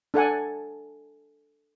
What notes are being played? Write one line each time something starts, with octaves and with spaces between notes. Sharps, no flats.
D4 A4 F#5 G#5